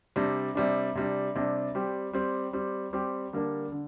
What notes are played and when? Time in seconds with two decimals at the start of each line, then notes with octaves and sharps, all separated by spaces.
0.16 C3 G3 D4
0.55 C3 G3 D4
0.95 C3 G3 D4
1.35 C3 G3 D4
1.75 G3 C4 G4
2.13 G3 C4 G4
2.53 G3 C4 G4
2.93 G3 C4 G4
3.33 D3 G3 A#3 D4
3.72 D3